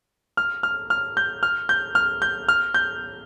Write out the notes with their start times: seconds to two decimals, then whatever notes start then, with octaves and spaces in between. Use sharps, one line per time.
0.37 F6
0.63 F6
0.90 F6
1.17 G6
1.43 F6
1.69 G6
1.95 F6
2.22 G6
2.49 F6
2.74 G6